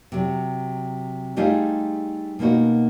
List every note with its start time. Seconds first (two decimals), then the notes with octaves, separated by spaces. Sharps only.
0.12 C3 F#3
1.36 G3 A3 D#4 F4 G4 G#4
2.39 B2 A#3 C#4 D#4 F#4